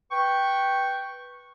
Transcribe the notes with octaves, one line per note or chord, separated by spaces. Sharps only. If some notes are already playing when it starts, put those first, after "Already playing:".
B4 G5 C#6